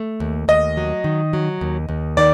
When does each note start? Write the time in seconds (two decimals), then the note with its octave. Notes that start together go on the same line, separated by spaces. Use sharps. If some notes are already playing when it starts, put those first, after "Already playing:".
Already playing: A3
0.20 D#2
0.48 D#2 D#5
0.77 F#3
1.04 D#3
1.33 F#3
1.61 D#2
1.89 D#2
2.17 D#3 D5